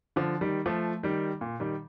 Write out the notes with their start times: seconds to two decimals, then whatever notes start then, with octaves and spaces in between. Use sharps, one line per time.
0.16 D3 F3
0.41 D#3 G3
0.66 F3 A3
1.03 D#3 G3
1.41 A#2
1.60 D#3 G3